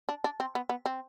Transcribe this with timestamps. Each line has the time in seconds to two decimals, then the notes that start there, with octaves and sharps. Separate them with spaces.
0.09 D4
0.24 D4
0.40 C4
0.55 B3
0.69 B3
0.86 C4